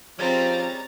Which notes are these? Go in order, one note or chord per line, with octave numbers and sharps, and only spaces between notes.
F3 G3 G#3 C4 C#4 A#5 A6